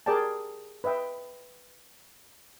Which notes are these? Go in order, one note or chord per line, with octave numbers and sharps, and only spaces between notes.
G4 G#4 A#4 D5 G5 A5
B4 D#5 E5 G5